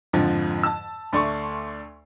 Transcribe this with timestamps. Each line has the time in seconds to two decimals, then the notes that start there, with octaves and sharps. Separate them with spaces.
0.13 F2 G#2 D3 F3
0.63 A5 E6
1.13 D2 A3 D5 C6 C#6